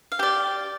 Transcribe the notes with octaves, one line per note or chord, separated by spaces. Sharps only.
F5
G4 D5 G5